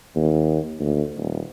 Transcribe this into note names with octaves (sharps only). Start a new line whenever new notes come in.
D#2
D2
D#1